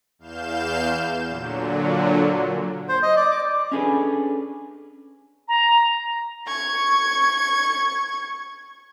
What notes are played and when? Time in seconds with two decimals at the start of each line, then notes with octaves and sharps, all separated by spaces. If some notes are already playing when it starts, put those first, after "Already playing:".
0.19 E2 F5 G6 E7
1.27 A#2 D3 F#3
2.89 C5
3.03 D#5
3.16 D5
3.31 D6
3.72 C#4 D4 G#4 A4 B4
5.48 A#5
6.48 C#6 G#6